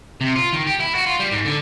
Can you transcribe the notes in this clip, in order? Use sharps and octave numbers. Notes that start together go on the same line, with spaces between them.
C3
F4
D#3
G4
E4
F#4
F4
G3
G#2
D3